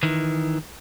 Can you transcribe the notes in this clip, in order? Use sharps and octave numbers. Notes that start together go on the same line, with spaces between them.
D#3 E3